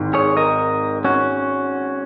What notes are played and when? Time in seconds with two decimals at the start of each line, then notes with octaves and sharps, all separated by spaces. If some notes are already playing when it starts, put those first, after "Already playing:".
Already playing: G#1 G#2 D#3
0.14 G#4 C#5
0.37 A#4 D#5
1.04 C#4 F#4